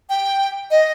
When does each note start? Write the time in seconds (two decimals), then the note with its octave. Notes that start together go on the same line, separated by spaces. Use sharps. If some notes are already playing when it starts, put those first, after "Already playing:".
0.10 G5
0.71 D#5